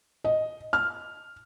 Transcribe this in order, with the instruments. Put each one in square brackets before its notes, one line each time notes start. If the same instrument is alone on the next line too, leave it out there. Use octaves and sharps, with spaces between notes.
[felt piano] D#5
F6